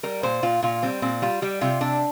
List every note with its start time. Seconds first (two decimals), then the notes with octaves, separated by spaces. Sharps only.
0.03 G3 A#4
0.23 A#2 C5
0.43 A#2 F4
0.62 A#2 F4
0.83 G3 C4
1.02 A#2 C4
1.22 G3 F4
1.42 G3 G4
1.61 C3 F4
1.81 C3 D4